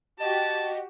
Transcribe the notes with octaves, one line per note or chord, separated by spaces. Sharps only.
F#4 G4 D#5 A5